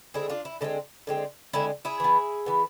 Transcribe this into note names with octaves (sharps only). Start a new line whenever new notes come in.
D3 G#3 C4 E4 G#4
D4 F4
E4
D3 G#3 C4 E4
D3 G#3 C4
D3 G#3 C4 E4
E4 G#4
E3 B3
E3 B3